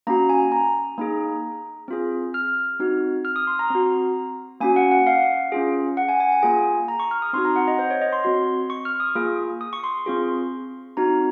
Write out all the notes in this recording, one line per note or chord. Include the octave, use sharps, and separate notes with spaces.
A#3 C#4 F#4 A#5
G#5
A#5
A#3 D#4 G#4
C4 F4 G#4
F6
C4 D#4 F#4
F6
D#6
C6
A#5
C4 F#4
A#3 C#4 F#4 G#5
F#5
F#5
F5
C#4 F4 G#4
F#5
G#5
G#5
G#5
A#3 F4 G#4 G#5
A#5
C#6
F6
D#6
C4 D#4 F#4 C6
A#5
F#5
D#5
C5
C#5
D#5
C6
C4 F#4 C6
C#6
F6
D#6
A#3 F4 G#4
D#6
C#6
C6
C4 F4 G#4
C4 D#4 F#4 A#5